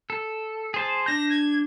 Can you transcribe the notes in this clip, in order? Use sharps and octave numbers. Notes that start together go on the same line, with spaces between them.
A4
G#4 C5 A5
D4 G6 A#6
G#6